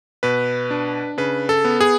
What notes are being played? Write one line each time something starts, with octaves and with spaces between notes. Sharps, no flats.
B2 B4
D4
C#3 B4
A4
B3
G#4